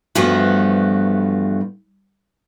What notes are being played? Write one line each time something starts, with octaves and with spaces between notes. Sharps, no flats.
G2 E3 F3 A3 B3 F#4